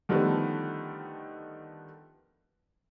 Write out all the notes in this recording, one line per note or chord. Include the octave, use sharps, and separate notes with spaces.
D3 D#3 F3 G3 A3 B3